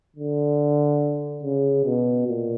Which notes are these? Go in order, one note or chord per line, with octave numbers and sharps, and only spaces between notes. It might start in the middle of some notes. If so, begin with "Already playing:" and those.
D3
C#3
B2
A#2